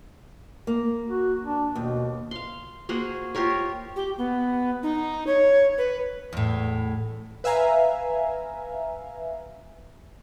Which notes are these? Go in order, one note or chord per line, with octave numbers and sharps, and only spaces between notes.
A#3
F#4
D4
D#2 B2
F5 C6
A#3 F#4 G#4 C5
F4 G4 A#4 C#5
G4
B3
D#4
C#5
B4
E2 A2
B4 E5 F5 G#5 A#5